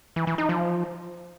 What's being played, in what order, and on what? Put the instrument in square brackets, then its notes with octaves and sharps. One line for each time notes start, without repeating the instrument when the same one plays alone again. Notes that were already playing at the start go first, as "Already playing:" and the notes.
[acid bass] E3
E3
D#4
F3